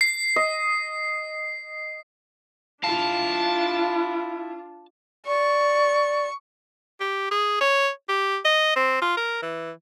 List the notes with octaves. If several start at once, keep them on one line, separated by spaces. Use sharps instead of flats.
C7
D#5
D4 E4 F4 F5 A5
D5 C#6
G4
G#4
C#5
G4
D#5
C4
F4
A#4
E3